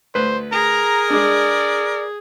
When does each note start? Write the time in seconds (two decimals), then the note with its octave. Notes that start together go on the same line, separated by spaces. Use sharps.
0.15 D2 B4 C5
0.52 G#4 A#4 A#5
1.10 G#3 D4 D5